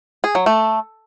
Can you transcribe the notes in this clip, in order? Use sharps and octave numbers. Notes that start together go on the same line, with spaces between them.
G#4
F#3
A3